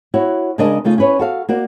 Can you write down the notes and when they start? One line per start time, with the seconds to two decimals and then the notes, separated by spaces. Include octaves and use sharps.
0.14 E4 F#4 C#5
0.58 C#3 G#3 D4 A#4 D#5 A5
0.84 C#3 A3 D#4 F4
0.98 C#4 E4 B4 C#5
1.19 F#4 A4 F5
1.49 A#3 F#4 D5